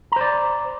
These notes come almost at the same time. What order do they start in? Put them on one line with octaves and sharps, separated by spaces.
A#5 C5 D5